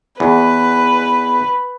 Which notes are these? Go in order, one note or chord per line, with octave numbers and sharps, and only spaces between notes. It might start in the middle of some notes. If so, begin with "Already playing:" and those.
E2 B4